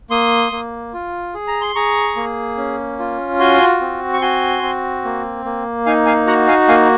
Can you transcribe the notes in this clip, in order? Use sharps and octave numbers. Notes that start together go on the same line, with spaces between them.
A#3 C6 D#6
A#3
F4
G#4
A#5
C6
G#4 A#5 C#6
A#3
C#4
F4
F#4 G#5 C6
C4
C#6
F#4 G#5 C6
C4
A#3
A#3
D#4 F5 G#5
F5 G#5
F#4 F#5 A#5
F5 G#5
A#3 F5 G#5